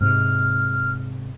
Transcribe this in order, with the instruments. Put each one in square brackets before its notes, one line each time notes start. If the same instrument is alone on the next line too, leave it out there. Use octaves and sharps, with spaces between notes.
[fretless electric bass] G#2 C3 [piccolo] F6